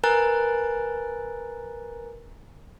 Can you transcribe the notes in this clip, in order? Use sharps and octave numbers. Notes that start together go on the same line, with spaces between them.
A#4 B4 G#5 A#5 F#6 A6